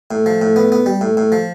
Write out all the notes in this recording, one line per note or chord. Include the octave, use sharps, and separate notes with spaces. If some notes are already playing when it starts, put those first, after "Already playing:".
A2
F3
A2
B3
B3
G3
A2
A2
F3